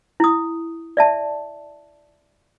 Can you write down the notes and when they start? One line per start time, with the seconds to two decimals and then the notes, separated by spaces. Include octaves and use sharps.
0.20 E4 D#6
0.97 D5 E5 A5